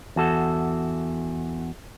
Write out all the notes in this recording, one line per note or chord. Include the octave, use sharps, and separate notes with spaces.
E2 F#4 A4